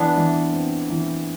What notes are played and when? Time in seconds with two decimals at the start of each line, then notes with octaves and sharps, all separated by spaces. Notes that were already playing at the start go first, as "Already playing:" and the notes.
Already playing: E3 B3 D4
0.17 E3
0.53 C4
0.90 E3